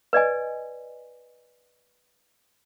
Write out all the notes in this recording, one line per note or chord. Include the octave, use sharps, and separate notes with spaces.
B4 D5 D#5 G#5